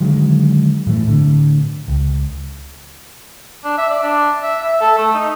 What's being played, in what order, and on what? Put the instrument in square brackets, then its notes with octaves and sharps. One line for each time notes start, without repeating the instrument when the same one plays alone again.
[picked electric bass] D3 D#3 F#3 G#3
A2 E3 F#3 A3
A2 D3
C#2
[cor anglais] D4
E5
D5
D4
E5
E5
A4
A3
D#4